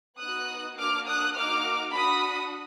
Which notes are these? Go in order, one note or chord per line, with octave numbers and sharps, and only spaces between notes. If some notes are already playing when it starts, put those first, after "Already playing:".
B3 D#4 F#4 D#6 F#6
A#3 D4 F#4 D6 F6
D#6 F#6
A#3 D#4 F#4 D6 F6
D4 F#4 B5 D#6